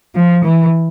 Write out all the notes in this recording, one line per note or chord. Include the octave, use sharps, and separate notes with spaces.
F3
E3